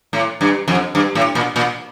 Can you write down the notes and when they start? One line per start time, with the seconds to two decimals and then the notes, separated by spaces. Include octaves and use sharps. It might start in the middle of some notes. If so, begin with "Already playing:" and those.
0.13 A2
0.41 G2
0.68 F2
0.95 G2
1.15 A2
1.35 A#2
1.56 A#2